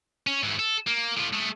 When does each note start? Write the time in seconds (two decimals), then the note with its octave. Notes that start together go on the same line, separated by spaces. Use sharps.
0.27 C#4
0.43 G#2 E3
0.59 A4
0.87 A#3
1.17 A2 F4
1.33 G#3 A3